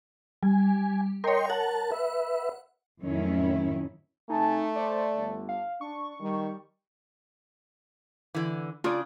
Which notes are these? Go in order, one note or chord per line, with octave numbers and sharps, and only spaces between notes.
G3 G#5
A#4 C#5 D#5 G5 C6
A#4 F#5 A5
B4 E5
F2 A2 D#3 F#3 C#4 E4
C3 A3 D#4 G#5 A5
C5 D5
G1 D3
F5
D4 C#6
D#3 G3
D3 E3
C#3 D4 F4 D5